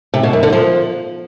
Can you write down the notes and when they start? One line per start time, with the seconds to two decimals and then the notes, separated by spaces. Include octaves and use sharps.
0.14 C3
0.23 B2
0.33 F#2
0.43 D3
0.52 F3